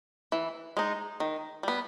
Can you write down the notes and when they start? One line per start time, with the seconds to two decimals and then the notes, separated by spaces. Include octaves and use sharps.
0.32 E3
0.77 G#3 D#4
1.20 D#3
1.63 G3 B3